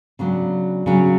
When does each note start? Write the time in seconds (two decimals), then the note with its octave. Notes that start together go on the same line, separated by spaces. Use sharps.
0.19 C#3 F#3 B3 D4
0.86 C#3 F#3 B3